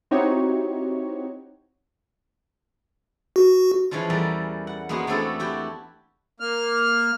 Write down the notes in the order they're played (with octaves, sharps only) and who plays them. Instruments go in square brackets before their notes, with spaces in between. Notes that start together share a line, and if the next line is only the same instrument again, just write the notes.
[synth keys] C4 D#4 E4 F#4 G4 C#5
[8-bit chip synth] F#4
[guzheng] E3 F3 G#3 C#4 F4
E2 G3 A4 A#4
F#5
G#3 A#3 B3 C#4 F#4
A3 B3 C4 D4 E4 A4
E4 F#4 G4 G5
[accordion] A#3 F6